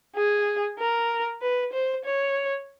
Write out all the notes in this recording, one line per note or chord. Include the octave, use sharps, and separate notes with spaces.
G#4
A#4
B4
C5
C#5